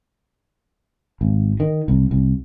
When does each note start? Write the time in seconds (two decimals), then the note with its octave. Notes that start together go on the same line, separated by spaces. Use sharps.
1.21 G#1
1.60 D#3
1.88 C2
2.11 C2